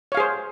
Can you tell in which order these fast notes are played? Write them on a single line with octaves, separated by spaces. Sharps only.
C#5 F5 G#4 C5